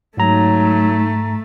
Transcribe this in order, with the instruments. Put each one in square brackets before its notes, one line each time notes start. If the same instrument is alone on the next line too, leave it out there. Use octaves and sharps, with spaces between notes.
[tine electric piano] G#2 A#5 [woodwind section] F#3 [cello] A3 [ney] D#4